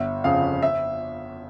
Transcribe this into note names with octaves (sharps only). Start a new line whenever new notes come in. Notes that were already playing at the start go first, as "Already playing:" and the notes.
Already playing: G1 E5
F2 C#3 F5
E5